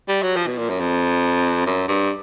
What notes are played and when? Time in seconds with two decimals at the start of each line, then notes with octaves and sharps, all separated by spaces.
0.08 G3
0.23 F#3
0.36 F3
0.47 B2
0.58 A#2
0.70 F#2
0.80 F2
1.66 F#2
1.88 G2